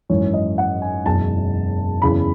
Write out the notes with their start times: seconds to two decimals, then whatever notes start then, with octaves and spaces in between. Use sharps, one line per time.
0.09 G#1 F#2 E3 C#5
0.34 D#5
0.58 F#5
0.82 G#5
1.06 F#1 E2 B2 A5
2.02 F#1 E2 C#3 E3 B5